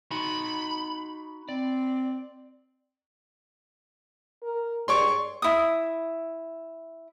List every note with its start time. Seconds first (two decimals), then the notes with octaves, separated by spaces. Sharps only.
0.11 D#4 F#4 B5 C6
1.49 C4 D5
4.43 A#4
4.88 G2 G#4 C#5 D5 C6 C#6
5.42 E4 D#6